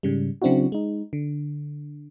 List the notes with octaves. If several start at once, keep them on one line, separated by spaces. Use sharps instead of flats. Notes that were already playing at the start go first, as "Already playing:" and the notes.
G#2 C#3 G3
C#3 F#3 C4 D4 E4 F#4
G#3 D#4
D3